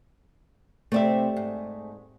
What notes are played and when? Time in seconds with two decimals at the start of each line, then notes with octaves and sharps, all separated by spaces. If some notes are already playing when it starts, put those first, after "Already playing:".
0.92 C3 A3 C4 D5 E5
1.36 G#2